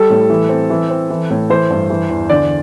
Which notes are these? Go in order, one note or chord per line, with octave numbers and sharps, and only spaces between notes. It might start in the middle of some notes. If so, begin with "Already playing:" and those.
Already playing: G3 A4
A2
E3
C4
E3
C4
E3
A2
E3 C5
G2
E3
E2
D3 D5